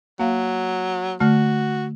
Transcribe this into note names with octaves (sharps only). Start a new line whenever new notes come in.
F#3 A#3 F5
D3 A3 F#4 F6